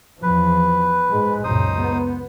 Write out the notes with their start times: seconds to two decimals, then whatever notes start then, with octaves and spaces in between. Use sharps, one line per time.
0.23 E2 F3 B4
1.09 G#2 G#3
1.44 C#2 F#2 A#2 D#4 C5 D#6
1.79 B3